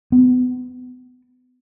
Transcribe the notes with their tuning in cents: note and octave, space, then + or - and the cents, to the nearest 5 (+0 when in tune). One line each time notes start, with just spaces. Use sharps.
B3 +30